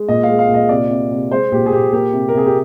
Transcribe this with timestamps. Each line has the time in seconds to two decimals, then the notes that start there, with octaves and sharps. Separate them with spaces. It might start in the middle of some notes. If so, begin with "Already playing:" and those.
Already playing: G#3
0.08 A#2 D#5
0.23 G#3 F5
0.39 F5
0.49 A#2
0.54 D#5
0.69 C3 D5
0.90 C3
1.11 C3
1.31 G#3 C5
1.52 A#2 G4
1.66 G#4
1.72 A#2 G4
1.92 A#3 G4
2.13 C3
2.28 A#4
2.34 C3 G#4
2.46 G4